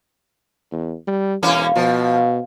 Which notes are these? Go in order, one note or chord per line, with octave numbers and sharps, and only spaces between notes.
E2
G3
E1 E3 A#3 C#4
B2 F3